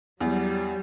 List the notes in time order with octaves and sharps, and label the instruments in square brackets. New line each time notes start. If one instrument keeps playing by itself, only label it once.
[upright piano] E2 [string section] F#3 G3